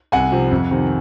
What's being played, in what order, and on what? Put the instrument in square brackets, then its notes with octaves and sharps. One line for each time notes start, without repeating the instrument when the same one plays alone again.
[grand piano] C2 F#5 G#5
C3 F3
F2
C3 D#3